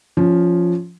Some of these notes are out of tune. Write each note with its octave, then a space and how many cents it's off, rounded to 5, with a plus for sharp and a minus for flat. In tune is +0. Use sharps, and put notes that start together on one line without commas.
F3 +0 C#4 +15